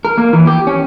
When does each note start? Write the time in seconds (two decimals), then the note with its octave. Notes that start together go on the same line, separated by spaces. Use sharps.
0.05 A#4
0.18 A#3
0.33 E3
0.47 G4
0.67 C#4